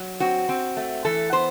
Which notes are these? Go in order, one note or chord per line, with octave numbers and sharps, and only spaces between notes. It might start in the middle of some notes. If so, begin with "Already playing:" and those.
Already playing: F#3
C4 F#4
C4
A3
E3 A4
B3 C5